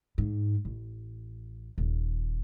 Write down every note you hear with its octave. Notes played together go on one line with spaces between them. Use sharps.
G#2
A1
D#1